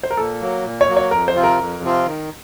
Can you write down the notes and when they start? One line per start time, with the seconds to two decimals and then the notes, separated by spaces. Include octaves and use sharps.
0.03 C5
0.11 A#4
0.17 A#2 A4
0.41 F#3 A#3
0.64 A#2
0.81 C#5
0.88 F#3 A#3
0.97 C#5
1.11 F2 A#4
1.28 C5
1.35 C3 F3 C4 F4
1.44 A#4
1.59 F2
1.83 C3 F3 C4 F4
2.06 D#3